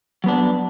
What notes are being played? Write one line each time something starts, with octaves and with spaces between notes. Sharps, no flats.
F#3 B3 D4